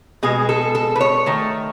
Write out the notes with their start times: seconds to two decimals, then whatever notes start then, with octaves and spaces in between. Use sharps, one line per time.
0.23 B2 G#3 G#4
0.49 A4
0.75 A4
0.95 B4
1.01 C#5
1.26 D#3 A3